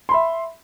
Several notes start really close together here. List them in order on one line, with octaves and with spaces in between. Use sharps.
C6 B5 E5